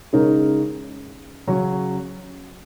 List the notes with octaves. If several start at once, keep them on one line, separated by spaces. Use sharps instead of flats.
C#3 G#3 D#4 A#4 C#5
C#3 F#3 C#4